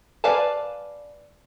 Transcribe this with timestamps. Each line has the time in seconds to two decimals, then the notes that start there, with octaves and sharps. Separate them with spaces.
0.24 B4 D5 F5 G#5 A5